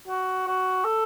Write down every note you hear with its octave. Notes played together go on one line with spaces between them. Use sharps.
F#4
F#4
A4